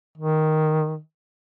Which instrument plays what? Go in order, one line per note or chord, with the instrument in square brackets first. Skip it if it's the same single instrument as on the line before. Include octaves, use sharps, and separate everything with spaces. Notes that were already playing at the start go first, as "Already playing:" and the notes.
[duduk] D#3